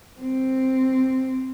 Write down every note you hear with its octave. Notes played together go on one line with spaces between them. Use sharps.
C4